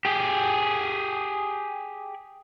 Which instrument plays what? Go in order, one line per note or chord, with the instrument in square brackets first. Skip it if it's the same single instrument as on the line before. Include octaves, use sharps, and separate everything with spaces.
[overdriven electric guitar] G4 G#4